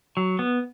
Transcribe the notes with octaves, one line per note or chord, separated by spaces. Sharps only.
F#3
B3